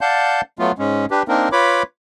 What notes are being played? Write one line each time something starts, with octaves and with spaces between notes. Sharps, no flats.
D5 F5 F#5 A5 G6
F#3 A3 B3 F4
G#2 G#3 C#4
D4 G4 B4
A#3 C4 D4 D#4 A#4
F4 B4 C#5 B5 D6